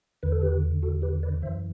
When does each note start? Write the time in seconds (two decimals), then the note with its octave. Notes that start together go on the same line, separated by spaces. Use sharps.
0.23 E2 D3 B4
0.32 A4
0.42 G4 B4
0.83 F#4 A4
1.02 G4 B4
1.23 B4 D5
1.42 E3 C5 E5
1.46 F#2